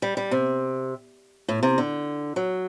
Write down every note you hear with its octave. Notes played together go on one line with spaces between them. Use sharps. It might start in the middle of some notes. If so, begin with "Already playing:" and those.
G3
G3
C3
A2
C3
D3
F#3